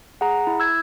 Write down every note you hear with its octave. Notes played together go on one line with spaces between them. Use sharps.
G#4 F#5 A#5
E4
E6 G#6